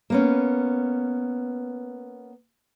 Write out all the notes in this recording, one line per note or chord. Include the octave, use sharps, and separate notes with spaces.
A#3 B3 C#4